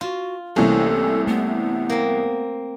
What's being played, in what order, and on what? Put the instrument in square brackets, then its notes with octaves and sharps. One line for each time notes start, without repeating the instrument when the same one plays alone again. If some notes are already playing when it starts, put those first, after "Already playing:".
[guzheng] F4 [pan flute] F#4
[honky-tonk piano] C2 C3 E3 [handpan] A3 A#3 C4 [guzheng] C#4 [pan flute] A4
[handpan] A3 [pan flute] B3
[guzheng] A#3 C4